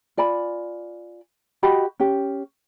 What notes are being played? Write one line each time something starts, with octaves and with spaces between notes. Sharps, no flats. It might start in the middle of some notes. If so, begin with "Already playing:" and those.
F4 D5 G#5 B5
F#4 G4 D#5 B5
C#4 G4